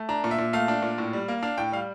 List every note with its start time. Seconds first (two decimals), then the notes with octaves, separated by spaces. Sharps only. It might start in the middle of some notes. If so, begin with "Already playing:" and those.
Already playing: A3
0.09 D4 A#5
0.24 A#2
0.31 E5
0.38 A#2
0.53 A3 F5
0.68 D4
0.83 A#2
0.98 A2
1.13 G3
1.28 A#3
1.43 D4 F5
1.58 A2 G5
1.72 G3 F5